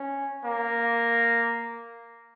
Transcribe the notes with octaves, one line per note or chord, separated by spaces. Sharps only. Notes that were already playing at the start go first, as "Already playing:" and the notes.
Already playing: C#4
A#3